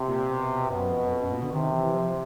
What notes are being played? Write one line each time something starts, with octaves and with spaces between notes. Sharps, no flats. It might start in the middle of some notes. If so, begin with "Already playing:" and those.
Already playing: C3
A#2
B2
F#2 B2
F2
F#2
F2
F#2
A#2
D3
C3 D#3
E3
F3